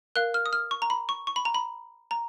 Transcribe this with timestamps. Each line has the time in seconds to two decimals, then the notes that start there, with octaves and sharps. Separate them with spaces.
0.16 A#4 F5 F#6
0.34 F6
0.46 D#6
0.53 F6
0.71 C#6
0.82 A#5
0.90 B5
1.09 C#6
1.27 C#6
1.36 B5
1.45 A#5
1.55 B5
2.11 A#5